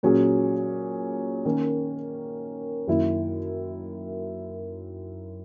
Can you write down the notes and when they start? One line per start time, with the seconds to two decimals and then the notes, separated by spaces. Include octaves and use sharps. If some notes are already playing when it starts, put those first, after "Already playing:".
0.03 A#2 F#3 C#4 G#4
1.45 D#3 A#3 C#4
2.88 F#2 D#3 A#3 E4